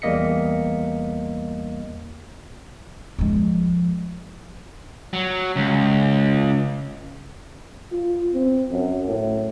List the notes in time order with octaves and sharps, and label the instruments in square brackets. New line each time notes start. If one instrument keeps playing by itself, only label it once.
[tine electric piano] E2 G3 A#3 D#5 B6 C#7
[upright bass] F3 G#3
[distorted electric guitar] F#3
C#2
[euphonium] F4
C4
F#2
A2